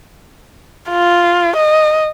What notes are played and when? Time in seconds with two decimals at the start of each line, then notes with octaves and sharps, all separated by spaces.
0.90 F4
1.56 D#5